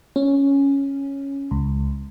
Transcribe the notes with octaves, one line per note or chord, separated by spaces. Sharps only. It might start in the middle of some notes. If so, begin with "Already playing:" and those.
C#4
C#2